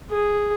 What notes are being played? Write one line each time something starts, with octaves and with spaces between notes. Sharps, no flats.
G#4